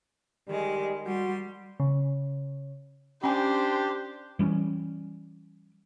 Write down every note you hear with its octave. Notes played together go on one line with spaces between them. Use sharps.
D#3 G3 G#3
G3 F#4 C6
C#3
C#4 D4 G4 C5 G#5
E3 G3 C4 C#4